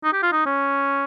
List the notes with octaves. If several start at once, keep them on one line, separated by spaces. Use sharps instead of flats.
D#4
G4
F4
D#4
C#4